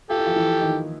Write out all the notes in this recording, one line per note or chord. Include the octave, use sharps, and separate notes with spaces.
F4 G4 A4
E4
F3 F4
E3 E4
D#3 D#4